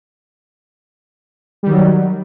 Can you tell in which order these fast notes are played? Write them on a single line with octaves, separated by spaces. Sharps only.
G3 D#3 F#3